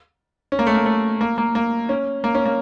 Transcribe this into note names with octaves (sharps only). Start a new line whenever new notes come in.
C#4
A#3
A3
A#3
A3
A#3
A#3
A#3
C#4
A#3
C#4
A#3